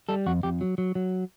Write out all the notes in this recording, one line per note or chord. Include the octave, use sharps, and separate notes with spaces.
G3 A4
F2 F#4
F2 G4
F#3
F#3
F#3